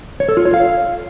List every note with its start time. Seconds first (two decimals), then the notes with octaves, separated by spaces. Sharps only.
0.20 C#5
0.29 A4
0.37 F4
0.45 C#5
0.54 F5